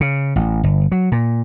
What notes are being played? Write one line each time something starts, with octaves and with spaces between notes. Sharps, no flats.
C#3
A1
G1
F#3
A#2